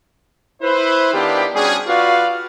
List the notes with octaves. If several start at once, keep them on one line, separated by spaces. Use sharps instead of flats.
E4 B4 C5
D#3 B3 D4 E4 F4 G4
G3 C#4 D4 F#4 G#4
F4 F#4 B4 D5 F5